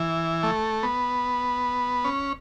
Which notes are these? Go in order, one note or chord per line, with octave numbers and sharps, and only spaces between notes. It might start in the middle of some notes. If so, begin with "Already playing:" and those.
Already playing: E3
A3
B3
C#4